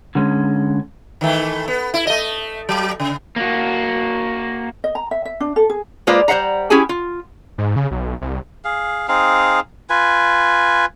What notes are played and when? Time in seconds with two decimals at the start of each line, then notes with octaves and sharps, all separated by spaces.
0.15 D3 G#3 C#4
1.21 D#3 E3 A3
1.68 B3
1.94 E4
2.07 A3 D#5
2.69 F#3
3.00 C#3
3.36 A#3 F#4
4.84 D#5
4.95 A#5
5.11 E5
5.25 E5
5.40 D4
5.56 A4
5.70 G#4
6.07 G#3 A#3 F4 B4 C5 D5
6.28 G3 C5 E5 F#5 A#5
6.70 C#4 E4 G4 G#4 G#5
6.89 F4
7.58 G#2
7.76 C#3
7.91 B1
8.21 C2
8.65 G#4 F5
9.08 C4 D#4 G#4 F5
9.90 F4 B4 G#5